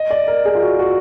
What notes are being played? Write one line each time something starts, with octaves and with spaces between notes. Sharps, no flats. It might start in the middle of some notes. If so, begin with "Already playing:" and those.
Already playing: D#5
D5
A#4
G#4
F4
F#4
F#4